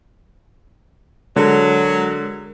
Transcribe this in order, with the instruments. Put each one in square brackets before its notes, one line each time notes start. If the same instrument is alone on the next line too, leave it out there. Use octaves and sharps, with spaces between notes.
[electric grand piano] D3 [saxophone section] F#3 [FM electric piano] G#3 A#4